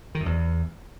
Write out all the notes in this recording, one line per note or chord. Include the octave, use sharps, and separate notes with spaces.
D#3
F#2
E2